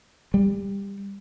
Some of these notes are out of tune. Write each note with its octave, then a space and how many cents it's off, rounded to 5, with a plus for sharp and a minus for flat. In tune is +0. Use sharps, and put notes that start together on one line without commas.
G3 +25